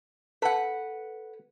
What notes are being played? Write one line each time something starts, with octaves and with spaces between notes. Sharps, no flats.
A4 B4 F#5